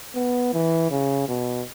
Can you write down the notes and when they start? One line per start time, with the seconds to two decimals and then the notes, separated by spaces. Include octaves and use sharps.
0.15 B3
0.53 E3
0.91 C#3
1.28 B2